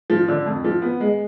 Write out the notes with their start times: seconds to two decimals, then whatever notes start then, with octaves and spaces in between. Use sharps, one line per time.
0.10 F3
0.28 D3
0.46 F2
0.64 F3
0.82 B3
1.00 G#3